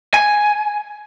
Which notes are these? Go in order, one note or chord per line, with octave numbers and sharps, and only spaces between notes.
G#5